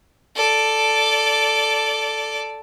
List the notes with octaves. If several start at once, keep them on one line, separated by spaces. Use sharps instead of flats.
A4 D5